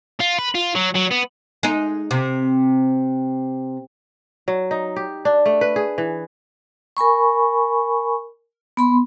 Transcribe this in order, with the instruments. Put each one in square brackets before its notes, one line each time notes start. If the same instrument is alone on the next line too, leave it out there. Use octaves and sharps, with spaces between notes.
[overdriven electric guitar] F4
B4
F4
F#3
F#3
B3
[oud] G#3 D#4
C3
[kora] F#3
D#4
G4
D4
A3
B4
G#4
E3
[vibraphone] A#4 G#5 B5 C#6
B3 B5 C6